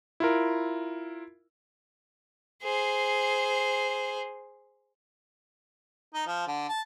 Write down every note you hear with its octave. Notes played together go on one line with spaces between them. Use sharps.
E4 F4 A#4
G#4 C5
D#4
F3
D3
A5